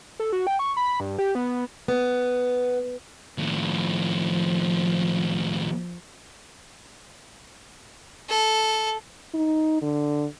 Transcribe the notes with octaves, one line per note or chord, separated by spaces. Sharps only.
A4
F#4
G5
C#6
B5
G2
G4
B3
B3
D#2 A2 F3
A4
D#4
D3